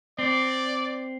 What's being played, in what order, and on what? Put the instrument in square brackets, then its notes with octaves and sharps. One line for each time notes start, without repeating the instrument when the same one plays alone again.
[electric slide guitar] C4 [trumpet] D5